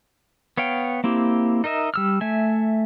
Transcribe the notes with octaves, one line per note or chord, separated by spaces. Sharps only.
B3 C#5 F5 G5
A#3 C4 E4 G4
D#4 A#4 D#5 E5
G3 E6 F6
A3 E5 G#5